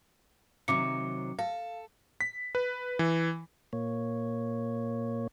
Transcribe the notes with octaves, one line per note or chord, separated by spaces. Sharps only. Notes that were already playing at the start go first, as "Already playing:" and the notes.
C3 D#3 F#3 D6 C#7
A4 F5
B6
B4
E3
A#2 A#3 C#5